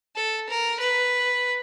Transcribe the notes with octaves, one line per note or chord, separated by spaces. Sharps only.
A4
A#4
B4